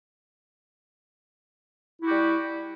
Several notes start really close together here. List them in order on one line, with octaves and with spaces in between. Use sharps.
E4 F#4 G4 G3